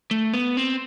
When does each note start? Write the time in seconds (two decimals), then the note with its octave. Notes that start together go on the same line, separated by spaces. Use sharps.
0.11 A3
0.34 B3
0.57 C4